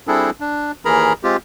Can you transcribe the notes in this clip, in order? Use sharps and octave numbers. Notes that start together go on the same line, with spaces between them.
G3 C4 D4 E4 G#4 A4
D4
D#2 E3 G#4 A#4 A#5 B5
G#3 C4 F4 G4